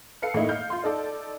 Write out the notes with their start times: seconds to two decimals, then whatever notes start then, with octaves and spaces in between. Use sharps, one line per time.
0.22 A4 B4 F5 C7 C#7
0.34 A2 A#3 D#4 E4
0.49 F5 F6 G6
0.70 F4 C6
0.84 D#4 A4 D5